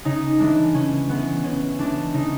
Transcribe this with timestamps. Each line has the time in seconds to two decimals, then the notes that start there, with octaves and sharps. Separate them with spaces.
0.05 C#3 D#4
0.39 E3 G#3 D4
0.74 C#3 C#4
1.09 E3 G#3 B3
1.44 C#3 C#4
1.79 E3 G#3 D4
2.13 C#3 D#4